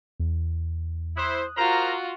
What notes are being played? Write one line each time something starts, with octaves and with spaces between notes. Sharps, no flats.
E2
E4 C5 D#6 F#6
F4 F#4 A#4 C5 A#5